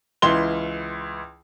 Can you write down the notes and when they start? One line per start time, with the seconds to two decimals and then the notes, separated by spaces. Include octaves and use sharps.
0.22 C#2 E3 C6 G7